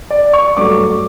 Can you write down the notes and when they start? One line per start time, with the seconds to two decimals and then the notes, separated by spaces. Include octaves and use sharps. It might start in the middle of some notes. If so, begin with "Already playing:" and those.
0.11 D5
0.33 C#6
0.57 G2 F#3 A3 D6